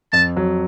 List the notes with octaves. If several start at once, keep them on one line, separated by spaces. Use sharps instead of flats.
F2 A5
F#3